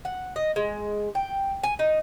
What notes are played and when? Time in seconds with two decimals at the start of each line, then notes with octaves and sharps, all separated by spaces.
0.05 F#5
0.36 D#5
0.56 G#3
1.15 G5
1.63 G#5
1.79 D#4